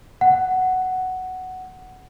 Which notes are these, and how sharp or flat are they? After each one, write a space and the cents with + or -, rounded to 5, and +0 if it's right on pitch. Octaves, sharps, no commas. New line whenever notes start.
F#5 +5